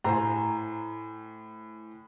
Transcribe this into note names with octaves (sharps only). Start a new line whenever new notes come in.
A2 C5 G#5 A#5